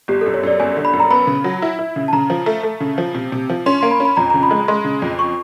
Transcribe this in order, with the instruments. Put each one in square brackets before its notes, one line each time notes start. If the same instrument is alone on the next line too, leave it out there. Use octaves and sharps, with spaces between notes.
[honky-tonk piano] G1 [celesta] G4
[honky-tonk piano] F#2 [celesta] A4
[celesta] C#5
[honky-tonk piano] F#2 [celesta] D5
[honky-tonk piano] G1 [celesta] G#5
[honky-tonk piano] D3
[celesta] B5
[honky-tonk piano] F#2
[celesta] A#5
[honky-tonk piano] B3 [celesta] B5
[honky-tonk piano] C#3
F#3
E4
E4
C#3
[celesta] A5
[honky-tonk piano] C#3 [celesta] A#5
[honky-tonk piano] F3
A3
A3
C#3
F3
C3
C3
F3
[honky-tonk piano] C#4 [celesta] C6
[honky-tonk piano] A#3 [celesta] C6
[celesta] B5
[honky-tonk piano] C#4
[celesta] B5
[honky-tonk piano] F2 [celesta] A#5
[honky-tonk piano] C#3 [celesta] A#5
[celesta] B5
[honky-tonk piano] G#3
[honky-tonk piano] G#3 [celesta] C6
[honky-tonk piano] C#3
F2
[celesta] C#6